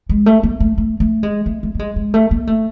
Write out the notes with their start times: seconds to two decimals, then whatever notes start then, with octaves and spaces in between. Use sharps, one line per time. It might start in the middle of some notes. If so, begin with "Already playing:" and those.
0.09 G#3
0.26 A3
0.43 A#3
0.60 A3
0.78 A3
1.00 A3
1.23 G#3
1.46 A3
1.63 A3
1.75 A3
1.79 G#3
1.96 G#3
2.14 A3
2.31 A#3
2.47 A3